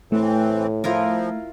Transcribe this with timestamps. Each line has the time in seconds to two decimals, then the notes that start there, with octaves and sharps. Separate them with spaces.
0.12 A2 E3 A3 C4
0.84 F3 E4 F4 A#4